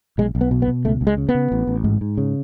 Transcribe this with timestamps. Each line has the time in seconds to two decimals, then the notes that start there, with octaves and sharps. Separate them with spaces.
0.18 B1 G#3
0.35 B1
0.41 B3
0.51 B2
0.62 B3
0.68 B2
0.85 C#2 A3
1.01 C#2
1.07 G#3
1.17 C#3
1.29 B3
1.35 C#3
1.52 A1
1.67 A1
1.84 G#2
2.01 G#2
2.17 C#3